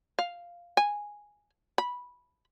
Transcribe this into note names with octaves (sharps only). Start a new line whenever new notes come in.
F5
G#5
B5